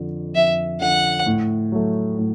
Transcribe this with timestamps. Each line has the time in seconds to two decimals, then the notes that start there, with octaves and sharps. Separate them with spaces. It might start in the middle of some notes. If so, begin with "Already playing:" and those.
Already playing: F2 D3 F3
0.35 F2 E5
0.81 D3 F3 F#5
1.26 A2
1.72 F#3 A3
2.18 A2